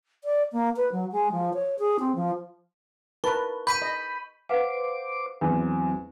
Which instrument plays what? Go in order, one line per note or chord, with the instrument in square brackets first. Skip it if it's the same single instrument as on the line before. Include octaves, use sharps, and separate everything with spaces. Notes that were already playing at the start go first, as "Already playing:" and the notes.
[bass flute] D5
A#3
B4
F#3
G#3
F3
C#5
G#4
C4
F3
[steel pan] A#4 B4 A5 [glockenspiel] C#6
[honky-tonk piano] B5 [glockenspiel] G6 B6 D#7
[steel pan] D#5
[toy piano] B4 F5 F#5 [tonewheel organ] C5 D6
[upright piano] E2 [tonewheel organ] F#3 C4